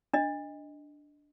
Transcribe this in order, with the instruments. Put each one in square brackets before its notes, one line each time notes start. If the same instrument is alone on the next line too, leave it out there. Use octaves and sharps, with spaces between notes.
[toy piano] D4 D#5